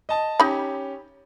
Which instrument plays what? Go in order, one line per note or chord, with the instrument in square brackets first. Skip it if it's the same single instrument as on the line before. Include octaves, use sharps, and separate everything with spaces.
[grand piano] D#5 A5
[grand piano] C#4 G4 [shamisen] D#4 B5